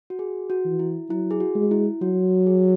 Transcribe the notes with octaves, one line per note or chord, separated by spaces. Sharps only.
F#4
G#4
F#4
E3
E4
F#3 E4
G#4
F#4
G#3
E4
F#3 F#4
G#4